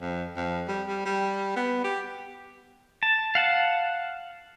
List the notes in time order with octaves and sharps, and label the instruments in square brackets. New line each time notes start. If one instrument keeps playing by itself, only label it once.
[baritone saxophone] F2
F2
G3
G3
G3
B3
G4
[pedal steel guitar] A5
F5 F#5 A5